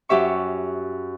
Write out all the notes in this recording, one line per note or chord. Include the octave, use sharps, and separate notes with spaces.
F#2 F#3 G4 E5 C#6